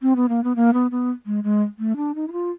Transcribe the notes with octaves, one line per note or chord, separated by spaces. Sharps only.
C4
B3
A#3
B3
A#3
B3
B3
G#3
G#3
A3
D4
D#4
E4
F4